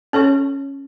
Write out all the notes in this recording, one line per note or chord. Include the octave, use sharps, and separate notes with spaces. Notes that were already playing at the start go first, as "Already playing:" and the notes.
C#4 A4 C#5 C#6